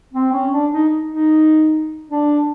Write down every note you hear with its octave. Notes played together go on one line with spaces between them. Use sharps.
C4
C#4
D4
D#4
D#4
D4